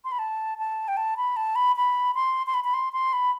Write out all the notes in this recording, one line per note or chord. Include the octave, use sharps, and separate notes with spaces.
C6
B5
A5
A5
G5
A5
B5
A5
B5
B5
C6
C6
B5
B5
C6
C6
B5